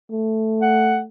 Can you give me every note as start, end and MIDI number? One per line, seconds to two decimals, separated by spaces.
0.11 1.09 57
0.62 0.99 78